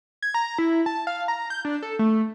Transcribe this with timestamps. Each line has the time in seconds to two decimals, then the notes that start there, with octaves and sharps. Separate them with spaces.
0.22 G#6
0.34 A#5
0.58 E4
0.86 A5
1.07 F5
1.28 A#5
1.50 G6
1.65 D4
1.82 A4
1.99 A3